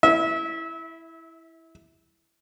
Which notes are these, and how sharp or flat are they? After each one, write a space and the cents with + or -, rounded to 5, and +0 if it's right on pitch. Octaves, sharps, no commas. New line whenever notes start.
E4 +0 E5 -30